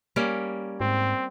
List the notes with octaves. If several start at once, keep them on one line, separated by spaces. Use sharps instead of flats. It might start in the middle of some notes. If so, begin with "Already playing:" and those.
G3 A#3 C#4
G#2 C4